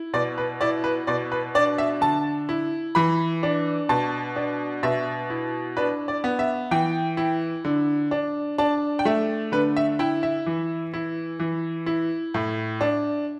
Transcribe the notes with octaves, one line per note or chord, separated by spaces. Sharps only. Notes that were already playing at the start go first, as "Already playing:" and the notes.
Already playing: E4
B2 D5
B4
E4 D5
B4
B2 D5
B4
D4 D5
E5
D3 A5
E4
E3 B5
D4
B2 A5
D4
B2 E5
E4
D4 B4
D5
B3
E5
E3 G5
E4
D3
D4
D4 A5
G5
A3 E5
D3 B4
E5
E4 G5
E5
E3
E4
E3
E4
A2
D4